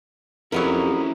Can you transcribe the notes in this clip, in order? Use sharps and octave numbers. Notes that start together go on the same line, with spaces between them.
F2 F#3 B3 C#4 E4 G4 A#4